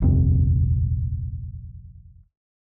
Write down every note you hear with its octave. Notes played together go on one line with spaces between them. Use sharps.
D#1 A#1 F2 C3